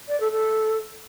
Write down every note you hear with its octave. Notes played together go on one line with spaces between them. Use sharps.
D5
A4
A4